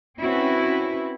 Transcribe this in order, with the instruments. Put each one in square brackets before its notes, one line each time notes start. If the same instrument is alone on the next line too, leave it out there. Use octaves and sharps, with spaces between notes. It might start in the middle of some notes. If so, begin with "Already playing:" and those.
[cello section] C4 C#4 E4 F#4 B4